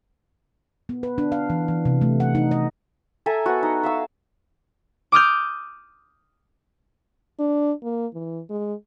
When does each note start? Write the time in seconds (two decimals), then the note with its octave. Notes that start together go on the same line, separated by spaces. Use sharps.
0.89 B3
1.03 B4
1.18 D4
1.32 F5
1.50 E3
1.68 E3
1.85 C3
2.02 A3
2.20 F#5
2.35 D#4
2.51 D#5
3.26 A4 E5 G#5 A#5
3.46 B3 F#4
3.63 D#4
3.83 E5 F5 E6
5.12 D6 D#6 F6 G6
7.39 D4
7.83 A#3
8.14 E3
8.50 G#3